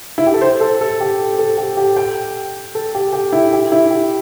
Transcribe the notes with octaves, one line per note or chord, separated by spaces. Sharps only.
E4
G4
A4
C5
A4
A4
G4
A4
G4
G4
G5
A4
G4
G4
E4
G4
E4
G4